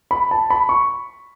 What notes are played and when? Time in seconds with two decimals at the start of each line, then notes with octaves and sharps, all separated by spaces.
0.11 B5
0.31 A5
0.50 B5
0.69 C#6